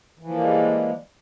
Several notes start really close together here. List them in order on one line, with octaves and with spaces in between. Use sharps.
E3 F3 A#3 G3 G#3